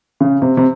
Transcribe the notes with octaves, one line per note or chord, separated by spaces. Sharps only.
C#3
C3
C3